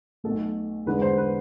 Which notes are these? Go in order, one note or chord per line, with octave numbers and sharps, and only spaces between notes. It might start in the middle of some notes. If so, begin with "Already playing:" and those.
B1 B2 A3 A4
E2 D3 G#3 B4
C5
B4